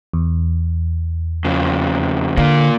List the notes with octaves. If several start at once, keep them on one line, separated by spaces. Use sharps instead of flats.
E2
F2 C#3
D3 A#3 F4